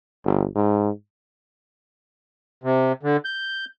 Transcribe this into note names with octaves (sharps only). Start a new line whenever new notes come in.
G1
G#2
C3
D3
G6